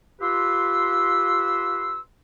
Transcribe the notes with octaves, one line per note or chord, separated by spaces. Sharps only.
F4 G4 B4 C6 E6